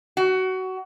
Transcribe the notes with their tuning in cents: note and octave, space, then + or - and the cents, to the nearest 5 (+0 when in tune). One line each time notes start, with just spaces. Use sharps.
F#4 +20